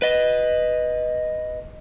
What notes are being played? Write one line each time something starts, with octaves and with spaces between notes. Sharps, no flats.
B4 D#5